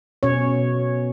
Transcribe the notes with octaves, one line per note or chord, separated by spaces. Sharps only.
B2 C#4 C#5